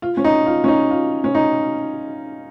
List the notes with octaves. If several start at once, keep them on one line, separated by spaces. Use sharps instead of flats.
F4
C#4
D#4
F4
C#4
D#4
F4
C#4
D#4